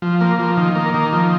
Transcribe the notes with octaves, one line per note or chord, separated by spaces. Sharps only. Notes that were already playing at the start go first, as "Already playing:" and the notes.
F3
A#3
F3
D#3
A#3
D#3
F3